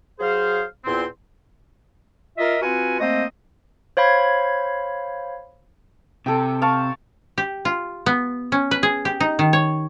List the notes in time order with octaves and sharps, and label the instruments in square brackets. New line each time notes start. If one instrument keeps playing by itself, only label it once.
[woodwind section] F#3 G#4 C5 F5
E2 A#2 C4 C6
F4 A#4 D#5 E5
C4 F4 F#4 B4 G#5
A3 A#3 C4 C5 D#5
[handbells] C5 C#5 F5 B5 G#6
[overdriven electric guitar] C3 [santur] A4 G5
[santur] F5 A5 C#6
[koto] G4
F4
B3
C#4
B4
G#4
G4
D#4
D#3
C#5